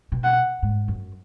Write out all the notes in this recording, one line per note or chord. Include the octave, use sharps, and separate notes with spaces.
B2
F#5
G#2
F#2